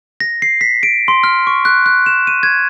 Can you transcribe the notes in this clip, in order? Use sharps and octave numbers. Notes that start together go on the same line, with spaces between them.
A#6
C7
B6
D7
C6
F6
C#6
F#6
F#6
E7
D#7
G#6